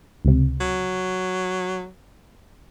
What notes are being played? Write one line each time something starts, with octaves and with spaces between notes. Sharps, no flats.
C#2 C3
F#3